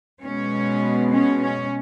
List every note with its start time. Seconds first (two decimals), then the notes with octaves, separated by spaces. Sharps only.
0.24 B2 G#3 B3 C#4
1.13 C#4
1.42 C#4